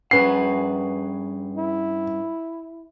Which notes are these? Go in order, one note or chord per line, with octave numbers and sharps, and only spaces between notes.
G2 C#4 G#4 B4 F#5 C7
E4